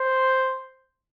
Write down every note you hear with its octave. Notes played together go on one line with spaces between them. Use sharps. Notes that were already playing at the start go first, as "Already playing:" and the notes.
Already playing: C5